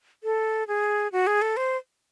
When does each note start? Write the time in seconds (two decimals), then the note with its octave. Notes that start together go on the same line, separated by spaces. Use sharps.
0.24 A4
0.68 G#4
1.12 F#4
1.27 G#4
1.42 A4
1.57 C5